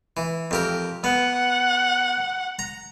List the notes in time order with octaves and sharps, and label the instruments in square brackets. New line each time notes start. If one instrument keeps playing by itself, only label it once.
[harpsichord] E3
F2 G4 A#4
[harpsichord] B3 [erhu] F#5
[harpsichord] A#5